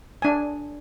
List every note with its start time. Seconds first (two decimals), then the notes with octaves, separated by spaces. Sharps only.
0.22 D4 G#5